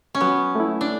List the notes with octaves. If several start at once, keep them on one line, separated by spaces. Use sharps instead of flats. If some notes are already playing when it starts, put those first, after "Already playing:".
C#4
F#3 B3
A3 E4
D4